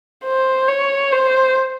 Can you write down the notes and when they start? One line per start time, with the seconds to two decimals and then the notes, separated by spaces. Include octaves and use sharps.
0.24 C5
0.68 C#5
1.12 C5